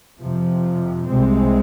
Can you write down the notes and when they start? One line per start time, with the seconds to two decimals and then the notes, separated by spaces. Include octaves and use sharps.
0.20 F2 C3 F3
1.07 C2 C3 G#3 C4